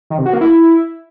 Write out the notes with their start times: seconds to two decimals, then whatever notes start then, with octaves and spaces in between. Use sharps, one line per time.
0.10 D#3
0.18 C3
0.26 F#4
0.33 A#3
0.41 E4